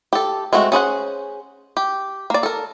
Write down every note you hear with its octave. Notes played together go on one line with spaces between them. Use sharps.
G4 A4
G#3 A3 C4 F#4
C#4 G#4 C5 F#5
G4
A#3 D5
A4 A#4